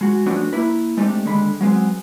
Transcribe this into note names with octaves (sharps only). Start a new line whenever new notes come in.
G#3 F#4
F3 A3 B3 C#4 D4 F#4
A#3 E4 B4
G#3 A3 C4 D4 D#4 G4
D#2 D3 G#3 B5
F#3 G#3 B3 C4